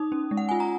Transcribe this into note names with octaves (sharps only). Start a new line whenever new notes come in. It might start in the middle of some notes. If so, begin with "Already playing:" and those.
Already playing: D#4 D#6
C#4
G#3
F#5
F4 G#5
A#5